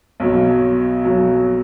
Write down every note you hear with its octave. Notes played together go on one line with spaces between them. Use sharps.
B1 B2 F#3
B1 B2 F#3